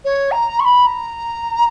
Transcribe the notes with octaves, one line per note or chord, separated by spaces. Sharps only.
C#5
A#5
C#6
B5
A#5